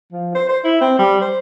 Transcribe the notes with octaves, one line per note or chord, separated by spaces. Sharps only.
F3
C5
C5
E4
C4
G3
C5